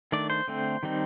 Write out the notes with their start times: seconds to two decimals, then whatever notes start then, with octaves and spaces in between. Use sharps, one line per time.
0.12 D#3 A3 D4 D5
0.30 C5
0.48 D3 A3 C4
0.83 D#3 G3 C4 D#4